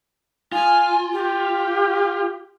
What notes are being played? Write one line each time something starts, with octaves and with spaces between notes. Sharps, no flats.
F4 G#5
G4